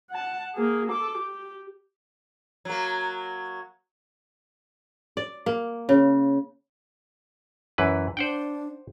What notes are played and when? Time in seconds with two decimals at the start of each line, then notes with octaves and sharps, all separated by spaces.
0.10 F#5 A5
0.55 A#3 G#4
0.89 A4 D6
1.18 G4
2.65 F#3 A#3
5.17 D5
5.46 A#3
5.89 C#3
7.78 F#2 E3 B4
8.17 D4 C5 F#5 G5